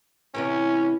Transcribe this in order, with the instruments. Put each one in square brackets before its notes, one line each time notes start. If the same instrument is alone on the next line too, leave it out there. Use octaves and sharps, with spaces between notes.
[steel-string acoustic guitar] A2 C3 E3 [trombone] C#4